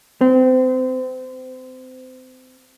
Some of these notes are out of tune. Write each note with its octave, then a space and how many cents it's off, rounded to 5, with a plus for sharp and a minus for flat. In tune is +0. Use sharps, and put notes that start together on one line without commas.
C4 -30